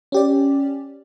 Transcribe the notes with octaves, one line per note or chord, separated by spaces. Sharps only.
C#4 G4 D5